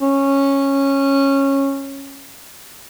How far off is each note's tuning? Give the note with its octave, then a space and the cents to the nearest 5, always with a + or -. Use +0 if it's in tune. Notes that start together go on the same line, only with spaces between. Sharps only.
C#4 -10